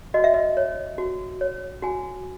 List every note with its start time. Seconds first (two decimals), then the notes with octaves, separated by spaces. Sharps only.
0.14 F#4 D#5
0.24 E5
0.34 D#5
0.57 C#5
0.98 F#4
1.41 C#5
1.82 F#4 G#5